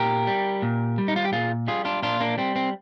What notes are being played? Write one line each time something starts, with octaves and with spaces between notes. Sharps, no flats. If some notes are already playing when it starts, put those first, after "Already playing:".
Already playing: A#2 G4 A#4
G3
A#2
G3
D#4
F4
G4
A#2 F4 G#4
G3 F4 G#4
D4 F4
A#2 D4 F4
A#3 D4
G3 C4
C4